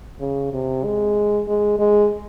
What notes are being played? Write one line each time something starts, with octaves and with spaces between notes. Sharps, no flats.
C#3
C3
G#3
G#3
G#3